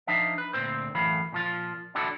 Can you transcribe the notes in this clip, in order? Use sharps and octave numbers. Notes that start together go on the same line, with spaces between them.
F3 D4 D#4 E5 F5
B4
D2 A#2 C4 C5
F#2 A2 E3 F5 B5
A#2 F3 F4
D4 E4 F#4 A4